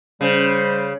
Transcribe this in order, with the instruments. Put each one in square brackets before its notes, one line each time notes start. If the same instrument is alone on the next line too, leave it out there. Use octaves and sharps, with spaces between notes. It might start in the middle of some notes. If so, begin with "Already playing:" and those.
[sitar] C#3 [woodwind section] G3 C5